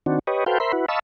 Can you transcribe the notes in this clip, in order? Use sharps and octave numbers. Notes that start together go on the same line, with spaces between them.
D#3 C4 D4 F#4
G4 B4 C#5 D#5
F#4 A4 B4 C5 F5 G5
A#4 C5 E5 B5 C6
E4 F#4 B4
D#5 F5 A5 B5 C#6 E6